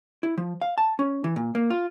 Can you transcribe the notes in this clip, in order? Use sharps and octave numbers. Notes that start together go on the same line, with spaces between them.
E4
F3
F5
A5
C#4
E3
A#2
A#3
F4